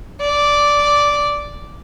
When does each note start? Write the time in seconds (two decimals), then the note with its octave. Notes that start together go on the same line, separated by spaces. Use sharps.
0.22 D5